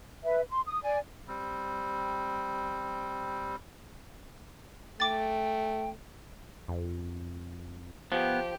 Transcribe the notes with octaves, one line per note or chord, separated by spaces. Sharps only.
B4 E5
C6
D#6
D5 G#5
G3 C4
A3 G5 D6 A6
F2
F3 B3 G4